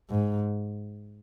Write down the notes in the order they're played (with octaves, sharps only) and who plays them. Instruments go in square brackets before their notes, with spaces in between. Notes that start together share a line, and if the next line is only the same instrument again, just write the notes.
[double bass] G#2